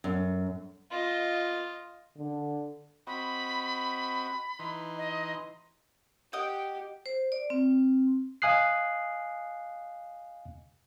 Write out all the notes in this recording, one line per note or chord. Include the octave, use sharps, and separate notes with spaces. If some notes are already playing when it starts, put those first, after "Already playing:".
F#2
F4 D#5
D3
C4 F#4 D#5 B5
E3 D#4 C6
D#5
G4 D#5 F#5 G5
C5
D5
C4
D#5 F5 G#5 D#6 F#6 C7